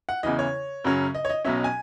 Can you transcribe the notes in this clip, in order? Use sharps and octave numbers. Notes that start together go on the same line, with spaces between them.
F#5
E2 C#3 E3 D#5
C#5
F#2 C#3 F#3 C#4
D#5
C#5
D#5
B1 B2 F#3 C#4 E5
G#5